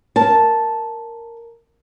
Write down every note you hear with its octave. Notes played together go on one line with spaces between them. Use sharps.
A#4 A5